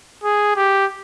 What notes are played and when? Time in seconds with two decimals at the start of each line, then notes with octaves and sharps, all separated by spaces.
0.24 G#4
0.56 G4